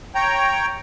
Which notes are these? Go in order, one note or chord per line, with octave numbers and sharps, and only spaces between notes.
C#5 G5 A#5